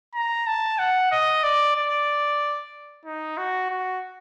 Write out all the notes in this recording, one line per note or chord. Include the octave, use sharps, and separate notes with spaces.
A#5
A5
F#5
D#5
D5
D5
D#4
F#4
F#4